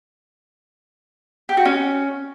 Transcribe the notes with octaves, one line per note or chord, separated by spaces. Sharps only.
G4
F#4
C#4